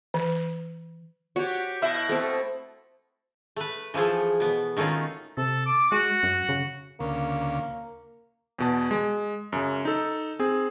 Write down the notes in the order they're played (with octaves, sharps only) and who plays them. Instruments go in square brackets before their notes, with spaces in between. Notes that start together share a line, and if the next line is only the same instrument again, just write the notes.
[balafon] E3
[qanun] F#4 [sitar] G4 C#5
[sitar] B2 E4 E5
[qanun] A3 C4 A4
[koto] A3 B4
E3 F3 A3 G#4 A4
B2 B3
D#3 A3 C#4 D#4 F4
[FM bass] C3 [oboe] A4
[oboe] D6
[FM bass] G#3 [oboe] F#4
[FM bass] F#2
C#3
[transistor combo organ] D2 C#3 [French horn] A#3
[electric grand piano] E2 B2 A5
G#3
F#2 C#3
D#4 A4
C4 G#4